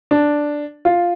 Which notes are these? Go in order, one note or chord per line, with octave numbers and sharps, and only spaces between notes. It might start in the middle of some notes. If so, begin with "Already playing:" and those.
D4
F4